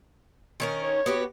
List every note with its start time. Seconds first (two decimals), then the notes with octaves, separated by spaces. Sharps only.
0.60 D#3 C#4 A#4
0.84 C#5
1.06 B3 F#4 G4